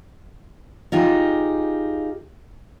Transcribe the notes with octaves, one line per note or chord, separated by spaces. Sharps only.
D#4 F4 G4 G#4